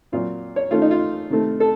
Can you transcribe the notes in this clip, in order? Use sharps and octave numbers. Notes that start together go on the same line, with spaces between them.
A#2 F#3 C4 F4
C#5
D#3 A3 C#4 F4
D#4
F4
C3 D#3 A3 C4
A4